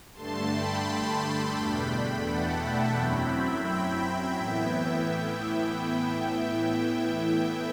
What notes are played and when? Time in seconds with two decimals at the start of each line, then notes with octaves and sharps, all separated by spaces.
0.13 G2 D3 A3 A5 C6
0.49 G5 B5
0.84 G5 B5
1.55 E2 B2 A3 D4
2.25 F#5 A5
2.60 E5 G5
2.95 F#2 F#3 C4 E4 G5 B5
3.30 E5 G5
3.66 E5 G5
4.37 A2 E3 B3 E4